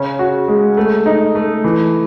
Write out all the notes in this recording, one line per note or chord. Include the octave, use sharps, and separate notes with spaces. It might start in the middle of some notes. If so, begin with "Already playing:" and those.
Already playing: C#3 C#4
F#4
G#3
A3
D#4
A3
E3